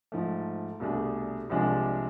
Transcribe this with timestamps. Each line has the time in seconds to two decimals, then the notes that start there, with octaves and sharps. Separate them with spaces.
0.12 G#2 F3 A3
0.80 C2 B2 A3 D4 G#4
1.50 C2 C3 F3 G#3 D4